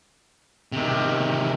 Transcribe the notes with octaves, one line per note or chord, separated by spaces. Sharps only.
C3 D#3